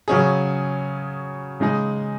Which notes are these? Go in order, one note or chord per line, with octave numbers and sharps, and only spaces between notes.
C#3 F#3 C#4 G#4
C#3 G#3 D#4 G#4